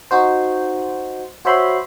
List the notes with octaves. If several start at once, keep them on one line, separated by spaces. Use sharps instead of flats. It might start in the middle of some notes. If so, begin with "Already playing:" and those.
D#4 F#4 C5
F#4 C5 C#5 E5 B5 C6